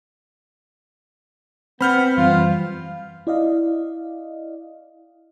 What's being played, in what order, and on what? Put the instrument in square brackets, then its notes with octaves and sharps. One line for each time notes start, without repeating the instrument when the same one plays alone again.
[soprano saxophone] B3 [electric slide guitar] C4 [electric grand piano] B5 F6 G6
[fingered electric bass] F#2 E3 G3 [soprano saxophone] F4
[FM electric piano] E4 D5 D#5 F5